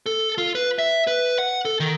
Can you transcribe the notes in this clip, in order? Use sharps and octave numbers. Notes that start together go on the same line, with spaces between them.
A4
F4
B4
E5
B4
F#5
A4
D#3